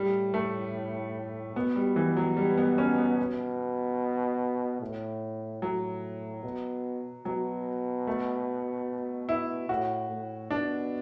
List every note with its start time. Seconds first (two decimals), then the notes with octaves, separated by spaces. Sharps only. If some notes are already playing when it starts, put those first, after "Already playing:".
Already playing: A2 G3
0.34 A3
1.56 B2 B3
1.76 G3
1.96 E3
2.17 F#3
2.37 G3
2.58 B3
2.78 C#4
2.98 B3
3.19 B2
4.81 A2
5.62 A2 F#3
6.43 B2
7.25 B2 F#3
8.07 A3
9.29 E4
9.69 A2 F#4
10.10 A2
10.50 B2 D4